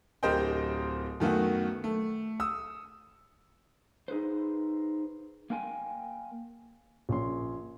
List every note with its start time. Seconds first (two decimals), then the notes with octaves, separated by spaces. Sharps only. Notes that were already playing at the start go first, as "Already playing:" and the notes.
0.23 D1 G4 A#4 C5 D#5 G5
1.20 F#2 D#3 A3 B3 F#4
1.84 A3
2.40 D#6 E6
4.08 D#4 G#4 B4 C5
5.50 A#3 A#4 G5 G#5
7.09 A#1 C#4 C6